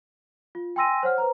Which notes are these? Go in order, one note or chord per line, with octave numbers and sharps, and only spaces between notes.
F4
G5 G#5 C6 E6 A#6 D#7
C5 C#5 F#5 F6
B4 C5 A#5